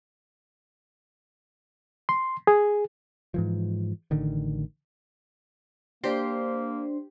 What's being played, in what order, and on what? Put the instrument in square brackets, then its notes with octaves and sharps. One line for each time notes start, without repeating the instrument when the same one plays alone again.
[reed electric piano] C6
G#4
[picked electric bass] G#2 E3 F3
A1 D3 D#3
[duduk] A#3 [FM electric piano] D4 C5 C6 [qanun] G4